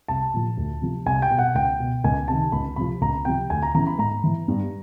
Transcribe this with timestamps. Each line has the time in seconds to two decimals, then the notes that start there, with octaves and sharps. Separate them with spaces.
0.08 C2 A5
0.34 A#2 F3
0.57 D2
0.82 C3 F3
1.06 C2 G#5
1.22 G5
1.30 B2
1.39 F#5
1.54 C#2 G5
1.80 B2
2.04 C#2 G#5
2.28 C3 D#3 A5
2.52 C#2 B5
2.76 C3 F3 B5
3.01 C#2 A#5
3.25 C3 F3 G5
3.50 D2 G#5
3.62 A#5
3.74 C#3 E3 A#5
3.87 B5
3.98 G#2 A#5
4.24 E3
4.48 G2